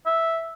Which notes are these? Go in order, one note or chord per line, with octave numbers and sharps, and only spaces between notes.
E5